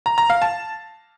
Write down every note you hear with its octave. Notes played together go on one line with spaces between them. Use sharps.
A#5
A#5
F5
A5